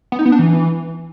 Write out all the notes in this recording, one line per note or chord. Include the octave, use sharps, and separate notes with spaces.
B3
D#4
B3
D4
E3